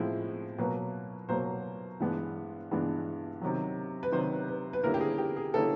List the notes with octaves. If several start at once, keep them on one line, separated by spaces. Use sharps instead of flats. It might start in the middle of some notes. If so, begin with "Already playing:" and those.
Already playing: A2 F3 G#3 C4 E4
B2 F#3 A#3 B4
B2 F#3 A#3 C5
G2 E3 G#3 B3 D4
G2 E3 G#3 B3 D4
C3 D#3 F#3
B4
C3 D#3 F#3 C5
B4
B4
D3 G3 A#3 C#4 E4 A#4
G4
G#4
G4
G#4
D3 G3 A#3 C#4 E4 A4